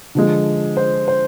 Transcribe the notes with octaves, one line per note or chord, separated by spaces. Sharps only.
D3 F3 G#3
C5
C5